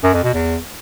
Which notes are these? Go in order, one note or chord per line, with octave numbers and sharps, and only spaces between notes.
F#2
F2
B2
E2